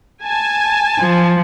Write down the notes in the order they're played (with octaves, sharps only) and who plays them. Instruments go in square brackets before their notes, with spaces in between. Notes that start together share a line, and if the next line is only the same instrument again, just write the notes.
[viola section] G#5 A5
[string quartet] F3